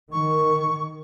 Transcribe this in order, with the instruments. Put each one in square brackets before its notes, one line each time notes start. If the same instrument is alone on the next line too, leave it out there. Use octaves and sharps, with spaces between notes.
[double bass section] D#3 [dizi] C#6